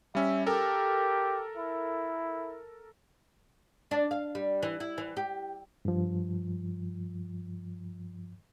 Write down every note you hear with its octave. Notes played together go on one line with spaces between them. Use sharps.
G3 C#4 E5
G4 A4 A#4
E4
D4
F5
G3
E3
E4
E3
G4
G2 F3